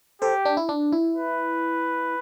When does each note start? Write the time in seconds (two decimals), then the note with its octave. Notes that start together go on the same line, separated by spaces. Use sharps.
0.22 G4 A4 C5
0.45 D4
0.57 E4
0.69 D4
0.92 E4
1.16 B4